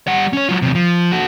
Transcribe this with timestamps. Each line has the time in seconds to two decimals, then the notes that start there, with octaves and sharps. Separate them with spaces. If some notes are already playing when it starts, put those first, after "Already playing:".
0.07 G3 F#5
0.33 C#4 C#5
0.49 F#3 F4
0.62 E2 C3
0.75 F3
1.12 F#4 A4